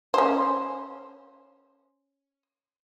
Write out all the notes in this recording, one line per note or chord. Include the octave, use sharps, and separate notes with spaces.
C#4 C5